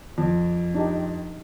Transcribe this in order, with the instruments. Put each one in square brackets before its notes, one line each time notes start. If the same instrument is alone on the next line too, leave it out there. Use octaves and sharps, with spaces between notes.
[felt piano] F2
[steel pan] D4 D#4 G4